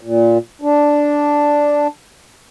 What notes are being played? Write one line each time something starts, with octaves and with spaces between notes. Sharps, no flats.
A#2
D4